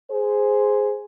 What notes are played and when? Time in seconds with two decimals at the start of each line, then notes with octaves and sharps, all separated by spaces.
0.11 G#4 C5